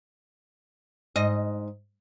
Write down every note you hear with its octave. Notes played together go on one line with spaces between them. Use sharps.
G#2 D#5